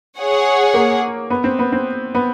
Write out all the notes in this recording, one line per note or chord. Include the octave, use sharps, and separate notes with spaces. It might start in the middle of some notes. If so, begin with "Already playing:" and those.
G#4 C#5 F#5
A#3
B3
C4
B3
C4
B3